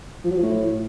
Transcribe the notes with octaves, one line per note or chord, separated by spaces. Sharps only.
F3
F#3
F3
A2